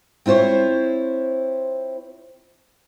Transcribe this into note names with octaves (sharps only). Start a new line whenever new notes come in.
C4 E4 F4 C5 C#5